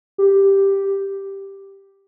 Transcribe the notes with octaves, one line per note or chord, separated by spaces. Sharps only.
G4